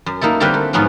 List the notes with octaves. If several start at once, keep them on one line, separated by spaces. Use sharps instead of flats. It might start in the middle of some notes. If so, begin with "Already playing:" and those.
F#2
A#3 D#4 E4 A4
D3 G3 A#3 C4 A#4 B4
A3
G#2 F3 F#3 B3 C#4 F4